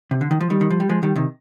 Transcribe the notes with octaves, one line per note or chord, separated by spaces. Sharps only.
C3
D3
D#3
F3
D#3 G3
D#3
F3
G3
F3 G#3
D#3 G3
C3 D#3